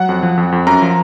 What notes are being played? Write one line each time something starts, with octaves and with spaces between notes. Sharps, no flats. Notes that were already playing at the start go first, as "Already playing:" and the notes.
Already playing: F#3 F#5
F2
F3
F2
F2
F#2 A#5
F3